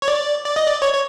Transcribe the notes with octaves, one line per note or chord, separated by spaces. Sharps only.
C#5
D5
D5
D#5
D5
C#5
C#5